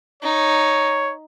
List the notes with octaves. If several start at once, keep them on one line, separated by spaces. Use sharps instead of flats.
D#4 C#5